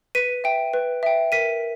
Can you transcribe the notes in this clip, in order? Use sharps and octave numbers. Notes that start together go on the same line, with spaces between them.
B4 B6 D#7
E5 G5
B4
E5 G5
A#4 B6 D#7